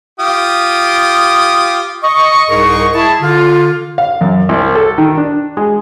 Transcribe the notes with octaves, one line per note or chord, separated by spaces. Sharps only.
F4 G4 D#6
D#5 C#6
C2 G#2 G#4 A#4 D#5 C#6
E4 G#4 A5
D3 F4
F5
F#2
C2
A4
D#3
D4
G#3